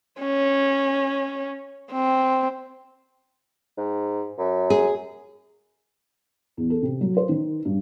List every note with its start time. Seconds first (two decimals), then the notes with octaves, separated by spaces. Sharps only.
0.20 C#4
1.92 C4
3.78 G#2
4.38 F#2
4.70 G#4
6.57 E2
6.70 A4
6.82 C3
7.01 F#3
7.17 C5
7.29 D#3
7.65 G2